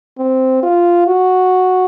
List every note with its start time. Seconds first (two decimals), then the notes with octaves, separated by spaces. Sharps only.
0.18 C4
0.63 F4
1.07 F#4